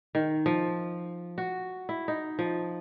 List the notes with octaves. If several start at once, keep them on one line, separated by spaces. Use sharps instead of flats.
D#3
F3
F#4
E4
D#4
F3